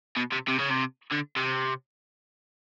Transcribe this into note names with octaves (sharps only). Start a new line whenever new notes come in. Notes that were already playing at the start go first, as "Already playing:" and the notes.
B2
C3
C3
C#3
C3
D3
C3